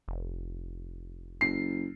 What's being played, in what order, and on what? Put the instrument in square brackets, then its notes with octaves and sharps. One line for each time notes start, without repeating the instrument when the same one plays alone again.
[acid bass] F1
[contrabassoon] F#1 [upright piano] C7